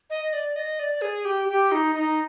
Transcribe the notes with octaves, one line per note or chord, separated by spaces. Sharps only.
D#5
D5
D#5
D5
G#4
G4
G4
D#4
D#4